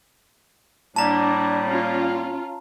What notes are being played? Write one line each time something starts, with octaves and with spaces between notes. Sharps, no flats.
A2 G3 A#3 D4 A5 A#5
C#4 F4